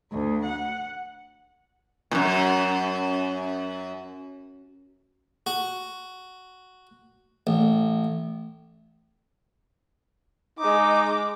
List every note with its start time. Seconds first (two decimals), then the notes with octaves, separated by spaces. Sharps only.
0.11 D2
0.44 F#5
2.11 F#2 A#2
5.47 F#4
7.47 A1
10.59 G#3 D#4 D6